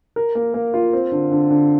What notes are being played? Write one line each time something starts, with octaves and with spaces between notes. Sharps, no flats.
A#4
A#3
A#3
F4
C4
D3
D3
D3